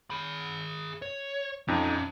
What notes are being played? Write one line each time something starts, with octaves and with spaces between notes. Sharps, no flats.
G#4 B5
C#5
F2 C#4 D#4 A4